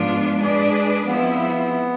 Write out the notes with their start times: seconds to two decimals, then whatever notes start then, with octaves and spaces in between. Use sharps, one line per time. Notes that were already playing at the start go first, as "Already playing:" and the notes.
Already playing: G#2 F3 B3 D4 F4
0.39 G#3 D4 G#4 B4 D5
1.07 F3 G#3 B3 C4 E4